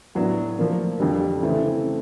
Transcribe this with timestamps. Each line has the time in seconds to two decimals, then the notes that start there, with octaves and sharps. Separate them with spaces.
0.15 A2 F#3 B3 D4
0.58 F3 A#3 D4
1.00 F2 D3 G3
1.42 C#3 E3 A3 C4